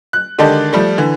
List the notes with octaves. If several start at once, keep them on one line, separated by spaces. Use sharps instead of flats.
F#6
D3 D#3 G#3 G4 A4 D5
F3 G3 A3
D3 E3